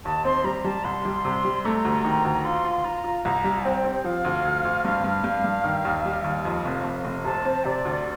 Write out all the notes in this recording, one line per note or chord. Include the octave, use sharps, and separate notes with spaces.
D#2 A5
C4 C6
G3 A#5
G3 A5
C2 C6
G3
C3
G3
A3 A#5
D2
D#3
D2
F4 C6
F4
F4 A#5
F4
C2 A#5
G3
C4 G5
C4
F3 F5
D2
D2
D2
G2 F5
G2
G2
G2
D#3
D#2
G3
D#2
F2
F1
F1
F1
C3 A5
C4
C3 D5
D2